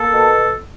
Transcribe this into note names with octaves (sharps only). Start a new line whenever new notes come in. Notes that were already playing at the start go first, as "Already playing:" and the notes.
Already playing: A#3 A4
B2